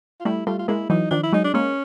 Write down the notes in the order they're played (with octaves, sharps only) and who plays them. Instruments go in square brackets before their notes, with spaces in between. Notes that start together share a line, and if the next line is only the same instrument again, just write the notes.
[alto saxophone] F4
[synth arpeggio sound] G3 A3 [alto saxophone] E4
[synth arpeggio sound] G3 A3 [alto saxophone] F4
[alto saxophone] F4
[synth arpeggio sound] G#3 A#3 [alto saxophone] E4
[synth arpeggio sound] E3 F#3 [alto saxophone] D#4
[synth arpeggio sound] D#3 F3 [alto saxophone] D4
[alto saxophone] E4
[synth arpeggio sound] F#3 G#3 [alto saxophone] D#4
[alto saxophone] D4
[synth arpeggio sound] G#3 A#3 [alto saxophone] C#4